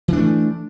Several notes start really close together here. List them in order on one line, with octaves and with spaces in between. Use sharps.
E3 D4 A3